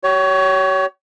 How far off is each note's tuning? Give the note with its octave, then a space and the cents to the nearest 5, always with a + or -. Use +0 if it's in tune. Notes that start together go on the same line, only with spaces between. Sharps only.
G4 -40 C#5 +20